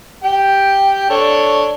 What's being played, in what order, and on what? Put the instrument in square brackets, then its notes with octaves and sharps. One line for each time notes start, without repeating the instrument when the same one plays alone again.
[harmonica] G4 G5
D4 A4 C#5